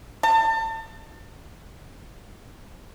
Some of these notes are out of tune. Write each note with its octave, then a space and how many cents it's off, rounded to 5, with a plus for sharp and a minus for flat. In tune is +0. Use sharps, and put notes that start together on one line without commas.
A5 +30